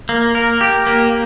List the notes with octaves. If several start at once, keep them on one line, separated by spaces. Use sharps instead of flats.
A#3
A#4
G4
A#3